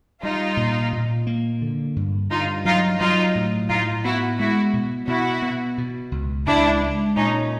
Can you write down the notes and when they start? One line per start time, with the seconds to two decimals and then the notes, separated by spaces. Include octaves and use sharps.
0.23 G3 D#4 F4
0.57 A#2
0.92 A#2
1.27 A#3
1.62 D3
1.96 G2
2.30 G2 D#4 F4
2.65 F#3 D#4 F4
3.00 F#3 D#4 F4
3.35 A2
3.69 A2 D#4 F4
4.04 B3 E4 F#4
4.38 G#3 E4 F#4
4.73 B2
5.07 B2 E4 F#4
5.42 B3
5.78 B2
6.12 C#2
6.47 C#2 D4 E4
6.81 G#3
7.16 A#2 C#4 D#4